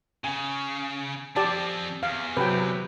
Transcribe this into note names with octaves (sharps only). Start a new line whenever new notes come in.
C#3 G#5
F3 C4 G4 D5 A5
E2 F5
C3 F#3 B4 G5